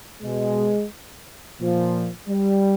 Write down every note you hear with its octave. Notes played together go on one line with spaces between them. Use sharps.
B2 G#3
A#2 F3
G3